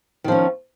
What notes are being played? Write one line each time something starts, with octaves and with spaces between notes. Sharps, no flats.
D#3 F3 C#4